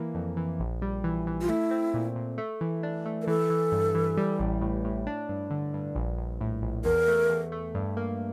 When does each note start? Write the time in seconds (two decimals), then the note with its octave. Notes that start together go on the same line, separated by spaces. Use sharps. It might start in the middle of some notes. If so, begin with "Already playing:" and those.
Already playing: E3 A#3
0.15 F2
0.37 E3
0.59 A#1
0.82 G3
1.04 E3
1.27 E3
1.41 F4
1.48 A3 E4
1.71 C4
1.94 A#2
2.16 A#2
2.38 A3
2.61 E3
2.83 D4
3.06 A3
3.22 A#4
3.27 E3 A4
3.50 E3
3.72 G2
3.95 E3
4.17 G3
4.39 A1
4.61 A2
4.84 A2
5.07 D4
5.29 G2
5.51 D3
5.74 G2
5.95 A#1
6.18 A#1
6.41 A2
6.62 A#1
6.85 E2 A#4
7.08 A3
7.30 E2
7.52 A3
7.75 G2
7.97 A#3